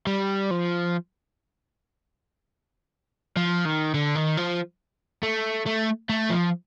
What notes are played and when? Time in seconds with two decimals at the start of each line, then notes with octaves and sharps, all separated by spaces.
0.06 G3
0.51 F3
3.37 F3
3.66 D#3
3.94 D3
4.15 D#3
4.37 F3
5.23 A3
5.66 A3
6.09 A3
6.30 F3